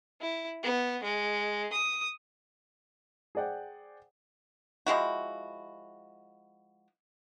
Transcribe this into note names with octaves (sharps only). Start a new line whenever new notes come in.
E4
B3
G#3
D#6
G#4 C5 D5 F#5 G5
F3 G#3 E4 F#4